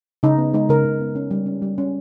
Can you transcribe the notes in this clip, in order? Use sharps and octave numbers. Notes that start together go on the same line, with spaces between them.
C#3 D#4
B3
G#3 D#4
C#3 A#4
C#3
B3
C#4
G3
C#4
G3
C#4